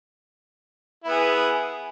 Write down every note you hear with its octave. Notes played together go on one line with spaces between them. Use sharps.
B3 E4 G#4